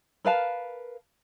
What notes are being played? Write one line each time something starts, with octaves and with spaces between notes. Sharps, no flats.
A#4 B4 F5 A5